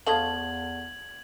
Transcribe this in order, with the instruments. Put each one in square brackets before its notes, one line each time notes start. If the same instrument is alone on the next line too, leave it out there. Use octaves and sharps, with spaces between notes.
[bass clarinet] E2 [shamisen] F3 A3 D#5 [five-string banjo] A4 F5 [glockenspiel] G#6 F#7